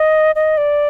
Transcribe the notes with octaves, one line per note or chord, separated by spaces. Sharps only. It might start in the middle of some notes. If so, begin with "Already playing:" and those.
Already playing: D#5
D#5
D5